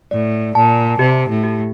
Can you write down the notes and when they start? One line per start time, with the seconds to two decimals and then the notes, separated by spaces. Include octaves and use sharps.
0.11 A2 D5
0.55 A#2 A5
0.99 C3 G4
1.29 A2
1.43 G4